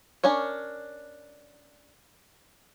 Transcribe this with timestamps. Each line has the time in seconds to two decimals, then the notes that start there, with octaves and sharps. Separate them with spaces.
0.24 C#4 D4 A#4 C#5